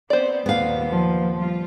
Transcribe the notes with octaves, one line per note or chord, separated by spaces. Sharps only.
B3 C4 C5 D5
D#2 A#2 B3 F5
F3
G3 F4